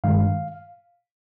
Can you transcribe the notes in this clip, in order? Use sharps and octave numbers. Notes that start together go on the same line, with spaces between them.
G2 D#3 G#3 F5